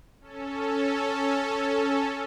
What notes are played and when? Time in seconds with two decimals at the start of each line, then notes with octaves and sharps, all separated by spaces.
0.21 C#4 A4